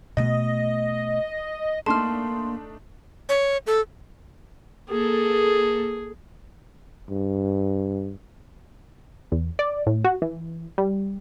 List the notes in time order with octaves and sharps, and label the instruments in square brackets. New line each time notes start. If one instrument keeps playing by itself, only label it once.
[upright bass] B2 A3 [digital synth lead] D#5
[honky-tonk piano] A3 D4 D#4 [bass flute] A#3 [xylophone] A5 F6 [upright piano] C6
[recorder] C#5
A4
[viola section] A#3 A4 [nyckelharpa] G#4
[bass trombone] G2
[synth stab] E2
D5
A2
F#4
E3
G3